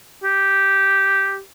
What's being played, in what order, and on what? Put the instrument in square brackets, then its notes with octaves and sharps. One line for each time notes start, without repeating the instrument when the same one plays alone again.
[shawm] G4